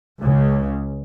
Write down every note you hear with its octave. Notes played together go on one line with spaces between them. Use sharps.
C#2 C#3